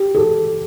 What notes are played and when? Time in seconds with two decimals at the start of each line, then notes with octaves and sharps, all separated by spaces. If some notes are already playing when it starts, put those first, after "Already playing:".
Already playing: G4
0.15 A4